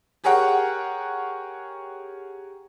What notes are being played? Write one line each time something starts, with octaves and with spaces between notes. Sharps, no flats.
G4 G#4 A#4 C#5 F#5 G5